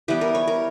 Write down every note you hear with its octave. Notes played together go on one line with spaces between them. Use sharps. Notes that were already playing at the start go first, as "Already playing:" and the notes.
E3 G3 B3 G4
A#4
C#5
A#4